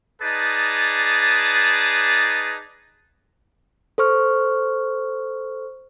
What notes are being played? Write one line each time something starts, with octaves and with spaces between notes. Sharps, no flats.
D#4 G#4 B4 D5 A5
A4 C5 C#6 F6